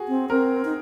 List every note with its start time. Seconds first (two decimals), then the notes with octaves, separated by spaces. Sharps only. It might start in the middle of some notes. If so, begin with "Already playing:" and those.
Already playing: F#4 G#4
0.08 C4
0.30 C4 A#4
0.65 D#4